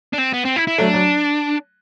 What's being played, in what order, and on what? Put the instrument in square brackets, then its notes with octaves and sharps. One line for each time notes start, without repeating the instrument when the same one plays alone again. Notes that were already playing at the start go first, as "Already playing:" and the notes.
[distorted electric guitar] D4
C4
B3
C4
E4
E4
[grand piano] F#3 A3 [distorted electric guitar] D4
[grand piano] F#3